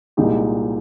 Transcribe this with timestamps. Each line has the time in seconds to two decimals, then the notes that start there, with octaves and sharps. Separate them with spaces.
0.17 C2 A#2 G#3 D#4 G4